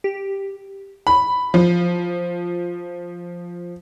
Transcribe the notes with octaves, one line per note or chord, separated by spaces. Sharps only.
G4
B5
F3